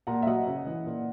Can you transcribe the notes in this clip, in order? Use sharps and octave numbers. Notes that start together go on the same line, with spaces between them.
A#2 F#5 A#5
E5
F#3 D#5 F#5
C#3
E3
A#2